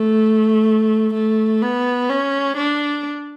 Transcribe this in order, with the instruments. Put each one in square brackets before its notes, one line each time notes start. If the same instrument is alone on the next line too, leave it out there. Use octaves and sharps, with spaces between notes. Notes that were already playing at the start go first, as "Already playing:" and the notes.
Already playing: [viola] A3
A3
B3
C#4
D4